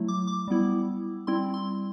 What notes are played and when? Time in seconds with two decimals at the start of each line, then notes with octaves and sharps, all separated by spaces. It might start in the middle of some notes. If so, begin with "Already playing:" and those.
Already playing: F#3 A3 E4
0.08 D6
0.27 D6
0.48 G3 B3 E4
1.27 G3 C4 E4 C6
1.54 C6